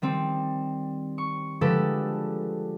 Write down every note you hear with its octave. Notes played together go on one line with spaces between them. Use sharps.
D#3 G3 C4
C#6
D3 F3 G#3 G4 A4 B4